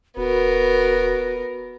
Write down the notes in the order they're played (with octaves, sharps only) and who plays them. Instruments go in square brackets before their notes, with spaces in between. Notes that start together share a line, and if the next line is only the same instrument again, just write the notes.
[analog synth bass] D#1 [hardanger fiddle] B3 A#4 [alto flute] F#4